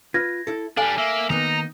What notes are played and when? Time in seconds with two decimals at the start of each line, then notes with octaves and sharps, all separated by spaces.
0.14 F4 B4 G#6 A#6
0.47 E4 A4
0.77 G3 D4 A4 F5 G#5
0.98 A#3 E5
1.30 D#3 A#3 B3 D#4 A#5